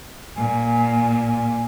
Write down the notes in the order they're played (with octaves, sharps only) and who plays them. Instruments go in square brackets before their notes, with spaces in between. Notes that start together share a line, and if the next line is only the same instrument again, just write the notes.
[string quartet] A#2 [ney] G#5